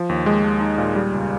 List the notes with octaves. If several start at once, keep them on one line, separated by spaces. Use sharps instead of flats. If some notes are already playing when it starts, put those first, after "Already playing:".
Already playing: F3
D#2
G#3
D#2
D#4
A#2
G3
C#2